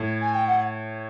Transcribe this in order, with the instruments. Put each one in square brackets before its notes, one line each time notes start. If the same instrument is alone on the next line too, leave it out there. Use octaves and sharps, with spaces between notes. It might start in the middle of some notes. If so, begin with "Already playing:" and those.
Already playing: [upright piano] A2
[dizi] G#5
G5
F#5